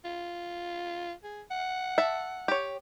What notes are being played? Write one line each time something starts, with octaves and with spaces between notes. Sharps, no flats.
F4
G#4
F#5
E5 A5
G4 C#5